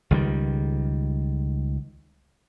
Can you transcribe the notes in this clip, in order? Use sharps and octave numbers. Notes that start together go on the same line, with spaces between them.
C#2 D#3 G3